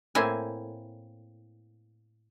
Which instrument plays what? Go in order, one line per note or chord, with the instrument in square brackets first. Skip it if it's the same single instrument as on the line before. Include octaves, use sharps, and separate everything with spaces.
[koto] A2 A#3 C4 E4 G#5